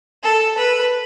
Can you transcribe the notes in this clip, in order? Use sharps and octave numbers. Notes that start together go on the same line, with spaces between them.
A4
B4